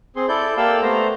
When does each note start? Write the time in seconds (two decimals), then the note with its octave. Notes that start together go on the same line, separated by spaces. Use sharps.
0.16 C4 G#4 C6
0.28 E4 A4 D5 G6
0.57 A#3 G4 A4 D5 F5 E6
0.82 A3 B3 C5 A#5